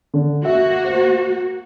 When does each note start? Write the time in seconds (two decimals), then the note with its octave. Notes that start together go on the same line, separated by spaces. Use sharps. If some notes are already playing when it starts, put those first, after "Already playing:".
0.14 D3
0.45 A#3 F#4 E5
0.84 C5